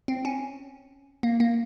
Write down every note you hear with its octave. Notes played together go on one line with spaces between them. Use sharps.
C4
C#4
A#3
A#3